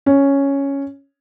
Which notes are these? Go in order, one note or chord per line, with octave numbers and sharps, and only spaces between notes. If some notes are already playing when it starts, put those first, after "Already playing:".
C#4